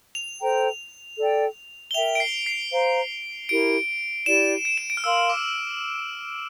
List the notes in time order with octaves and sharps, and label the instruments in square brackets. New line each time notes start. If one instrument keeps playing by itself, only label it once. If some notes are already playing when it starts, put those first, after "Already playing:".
[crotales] F7
[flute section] A4 C5 G5 A#5
A4 D5 G5
[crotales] G7
[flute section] A#4 E5 G5 [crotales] F7
[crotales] D7
C7
C7
[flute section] C5 F5 A#5
[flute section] E4 G4 A#4 [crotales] D7
[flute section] E4 G4 D5 [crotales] E7
[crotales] D7
E7
D7
F6
[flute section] A#4 F5 C6 [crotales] E6
[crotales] D6